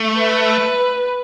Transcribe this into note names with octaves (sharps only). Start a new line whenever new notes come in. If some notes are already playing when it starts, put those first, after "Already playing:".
Already playing: A3
B4